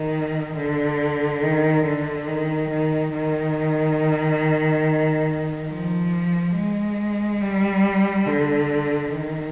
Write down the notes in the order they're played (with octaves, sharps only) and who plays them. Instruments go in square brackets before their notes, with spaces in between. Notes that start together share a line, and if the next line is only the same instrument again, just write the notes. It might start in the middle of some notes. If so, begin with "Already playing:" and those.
Already playing: [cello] D#3
D3
D#3
D3
D#3
D#3
D#3
F3
G#3
G3
D3
D#3